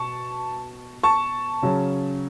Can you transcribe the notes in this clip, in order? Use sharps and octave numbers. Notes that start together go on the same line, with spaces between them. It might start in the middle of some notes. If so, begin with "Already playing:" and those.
Already playing: B2 A5 C#6
A5 C#6
C#3 F#3 C#4